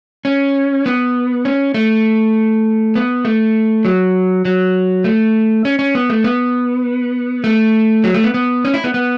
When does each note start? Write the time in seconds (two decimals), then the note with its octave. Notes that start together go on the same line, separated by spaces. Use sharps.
0.25 C#4
0.86 B3
1.45 C#4
1.74 A3
2.95 B3
3.25 A3
3.85 F#3
4.45 F#3
5.04 A3
5.65 C#4
5.79 C#4
5.95 B3
6.10 A3
6.24 B3
7.44 A3
8.04 F#3
8.14 A3
8.24 B3
8.34 B3
8.65 C#4
8.74 E4
8.84 B3
8.94 B3